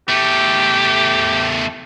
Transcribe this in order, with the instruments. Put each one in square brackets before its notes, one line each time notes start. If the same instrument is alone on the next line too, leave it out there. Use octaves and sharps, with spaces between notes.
[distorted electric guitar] E2 A3 [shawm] G4